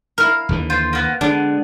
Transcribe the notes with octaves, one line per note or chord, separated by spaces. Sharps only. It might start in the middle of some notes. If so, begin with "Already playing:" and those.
E4 A#4 F5
D#2 D3 E3
F4 C5
A#3 B3
D3 G#3 B3 D4